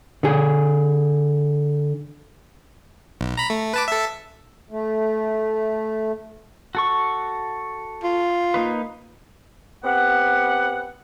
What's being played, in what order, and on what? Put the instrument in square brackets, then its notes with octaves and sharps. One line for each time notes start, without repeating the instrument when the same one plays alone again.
[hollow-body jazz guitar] D3 G#4
[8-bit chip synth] B1
A#5 B5
A3
B4 A5 D6
A4 E5
[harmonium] A3
[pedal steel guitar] F#4 A4 C#6
[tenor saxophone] F4
[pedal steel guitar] A#3 D#4 B4
[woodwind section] B3 C4 G4 F#5